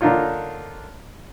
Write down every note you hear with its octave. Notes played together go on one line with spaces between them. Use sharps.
D3 A#3 D4 D#4 F4 C#5